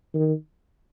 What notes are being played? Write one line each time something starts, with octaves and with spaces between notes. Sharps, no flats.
D#3